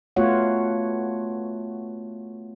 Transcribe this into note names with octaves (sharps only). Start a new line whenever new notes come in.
A3 B3 F4 F#4 C#5 F#5